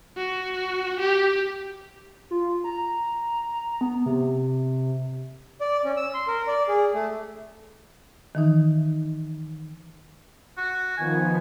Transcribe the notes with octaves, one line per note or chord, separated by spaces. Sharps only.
F#4
G4
F4
A#5
B3
C3
D5
C#4
E6
C6
A#4
D5
G#4
A3
D#3 E3 D#4
F#4
D#3 F3 B3 G#5